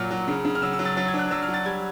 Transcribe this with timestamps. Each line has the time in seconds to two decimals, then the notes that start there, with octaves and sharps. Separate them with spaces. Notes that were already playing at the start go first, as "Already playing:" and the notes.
Already playing: A#2 F#3 F6
0.11 F#3
0.28 C#3
0.45 C#3
0.55 F6
0.62 F#3 E6
0.73 E6
0.79 F#3
0.85 A6
0.97 F#3 A6
1.08 G#6
1.14 D4
1.19 F#6
1.31 F#3 E6
1.42 F6
1.48 F#3
1.54 A6
1.65 G3 G#6